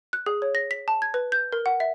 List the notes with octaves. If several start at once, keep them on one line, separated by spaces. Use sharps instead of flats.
F#6
G#4
C#5
A#6
B6
A5
G#6
B4
G6
A#4
F#5
E5